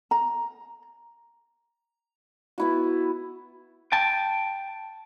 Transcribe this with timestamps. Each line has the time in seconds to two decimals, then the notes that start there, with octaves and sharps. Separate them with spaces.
0.11 A#5
2.58 B3 E4 F#4
3.92 G5 A5